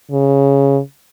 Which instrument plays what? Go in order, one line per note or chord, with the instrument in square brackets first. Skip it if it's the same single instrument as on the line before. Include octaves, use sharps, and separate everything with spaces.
[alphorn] C#3